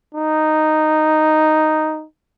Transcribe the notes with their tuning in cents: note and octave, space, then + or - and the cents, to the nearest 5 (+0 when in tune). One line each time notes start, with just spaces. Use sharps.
D#4 -5